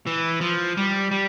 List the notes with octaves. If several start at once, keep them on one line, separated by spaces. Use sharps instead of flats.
E3
F3
G3
G3